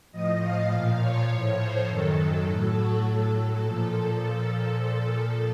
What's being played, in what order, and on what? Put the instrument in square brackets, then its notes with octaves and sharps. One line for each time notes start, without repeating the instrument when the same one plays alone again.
[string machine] A2 F3 D#5
F5
A#2 F3
C#5
A2 F3
C5
F#2 D#3 F#3 A4
A2 F#3
F#4
A2 F#3 A4
A#2 F3